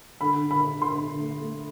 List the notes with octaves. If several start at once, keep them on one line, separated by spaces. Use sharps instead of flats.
D3 B5
D3
B5
D3
D3 C6
D3
A3
A3